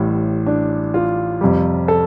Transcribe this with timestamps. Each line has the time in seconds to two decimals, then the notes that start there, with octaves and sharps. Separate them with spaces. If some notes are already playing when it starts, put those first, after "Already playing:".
Already playing: A1 A2 G3
0.47 D4
0.94 F4
1.41 F2 C3 G3
1.88 A4